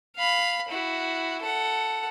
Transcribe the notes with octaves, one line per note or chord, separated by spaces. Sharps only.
F5 B5
E4 F#4
A4 F#5